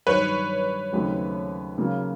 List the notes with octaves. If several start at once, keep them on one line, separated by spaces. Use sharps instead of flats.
G2 D#3 F#3 B4 C#5
D#2 C#3 F#3 A3 C4
C#3 F#3 A#3